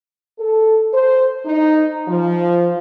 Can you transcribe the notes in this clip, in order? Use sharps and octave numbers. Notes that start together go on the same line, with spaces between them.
A4
C5
D#4
F3